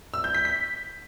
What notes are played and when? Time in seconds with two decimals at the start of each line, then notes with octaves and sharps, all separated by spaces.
0.14 E6
0.24 G6
0.35 B6
0.45 B6